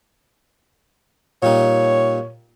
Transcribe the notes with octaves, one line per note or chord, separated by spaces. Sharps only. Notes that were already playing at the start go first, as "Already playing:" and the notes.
A#2 G3 D#4 C#5